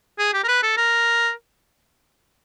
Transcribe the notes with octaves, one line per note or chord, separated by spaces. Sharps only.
G#4
G4
A#4
B4
A4
A#4